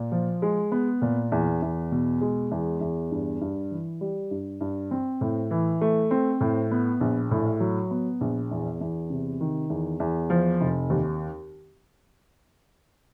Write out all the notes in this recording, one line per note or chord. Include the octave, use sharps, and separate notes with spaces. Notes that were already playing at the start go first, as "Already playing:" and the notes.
Already playing: A#2
F3
G#3
B3
A#2
E2
E2
B2
G#3
E2
E2
G2
G2
E3
G3
G2
G2
C4
A2
E3
A3
C4
A2
B3
A#1
A2
F#3
B3
A#1
E2
E2
C3
D#3
E2
E2
F3
F1
D#2